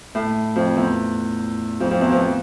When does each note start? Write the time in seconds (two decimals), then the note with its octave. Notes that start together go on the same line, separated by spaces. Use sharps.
0.15 A2
0.56 F2
0.77 E2
1.80 F2
1.91 F2
2.01 E2
2.12 F2